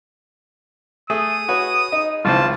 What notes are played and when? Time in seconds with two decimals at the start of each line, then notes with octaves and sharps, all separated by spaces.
1.10 A3 G#4 D#6
1.48 F#4 B4 C#5
1.92 D#4
2.25 G#1 C#2 A2 F4 C5 A5